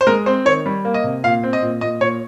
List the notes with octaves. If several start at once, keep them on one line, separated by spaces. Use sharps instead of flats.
C5
G#3 A#4
C4 C5
D#3 C#5
G3
A#3
D#5
C3
A#2 F5
C4
D#5
A#2
A#2 D#5
A#2 C#5